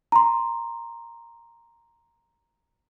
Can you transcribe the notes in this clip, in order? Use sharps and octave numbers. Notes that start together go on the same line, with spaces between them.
A#5 C6